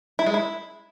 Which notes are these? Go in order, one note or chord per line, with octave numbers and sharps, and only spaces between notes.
E4
G#3
E4